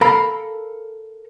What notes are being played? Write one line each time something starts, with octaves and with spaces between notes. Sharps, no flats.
A4 A#4 F5 A#5 B5